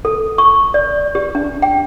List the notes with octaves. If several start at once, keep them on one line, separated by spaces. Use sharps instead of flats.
A4
C#6
D5
G4
D4
G5